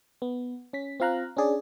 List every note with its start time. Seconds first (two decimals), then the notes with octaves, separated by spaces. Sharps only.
0.22 B3
0.73 C#4 B6
1.00 C4 F4 F5 A#5 F#6
1.37 C#4 D4 G#4 D5